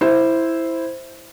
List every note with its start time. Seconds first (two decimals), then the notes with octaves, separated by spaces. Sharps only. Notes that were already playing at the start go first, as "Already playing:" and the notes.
0.01 E4 C5